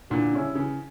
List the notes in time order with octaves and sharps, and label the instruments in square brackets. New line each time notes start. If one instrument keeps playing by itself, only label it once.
[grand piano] A#2 D3 [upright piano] E3
[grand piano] C#3 [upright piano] G3 C#4 E4
[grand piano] C#3 [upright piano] E3